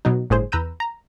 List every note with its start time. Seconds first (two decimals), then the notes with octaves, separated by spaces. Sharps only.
0.05 B2 F#3 D#4
0.30 G1 A2 G#4 C5
0.52 E2 B4 A#5 E6 G6 D#7
0.80 A#5